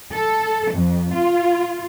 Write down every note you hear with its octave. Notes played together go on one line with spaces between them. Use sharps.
A4
F2
F4